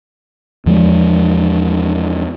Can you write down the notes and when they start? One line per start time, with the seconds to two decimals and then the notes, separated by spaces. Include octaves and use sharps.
0.66 E2 F3 G3 G#3